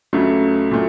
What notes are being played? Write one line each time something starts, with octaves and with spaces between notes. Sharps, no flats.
C#2 C#3 F#3 A3
A#2 F#3 A3